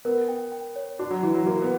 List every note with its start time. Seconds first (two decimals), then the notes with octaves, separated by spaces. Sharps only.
0.05 B3 A#4
0.28 G5
0.52 G5
0.76 C#5
0.99 D4 F#4
1.10 F#3
1.23 E3 F#4
1.35 F#3
1.46 A#3 F#4
1.62 B3